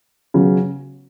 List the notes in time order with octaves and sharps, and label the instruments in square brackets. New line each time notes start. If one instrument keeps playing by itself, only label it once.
[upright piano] C#3 F#3 B3